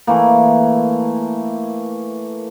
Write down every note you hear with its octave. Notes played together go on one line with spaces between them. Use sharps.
E3 A3 A#3